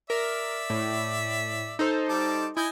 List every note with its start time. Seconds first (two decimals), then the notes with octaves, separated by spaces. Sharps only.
0.10 A#4 D5 E5
0.70 A2
1.79 D#4 A4 C5
2.09 G3 A5 D6
2.57 E4 D#5 G#5 G6